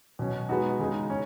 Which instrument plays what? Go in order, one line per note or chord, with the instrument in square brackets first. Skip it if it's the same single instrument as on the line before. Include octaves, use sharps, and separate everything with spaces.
[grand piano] B2 F#3 C#4
G#3 B3 D#4 F#4
C#3 G#3 D#4
C#4